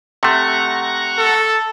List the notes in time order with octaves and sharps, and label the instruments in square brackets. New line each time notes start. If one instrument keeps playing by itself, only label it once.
[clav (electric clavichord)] C3 A3 [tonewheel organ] F#5 A#5 C#6
[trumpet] A4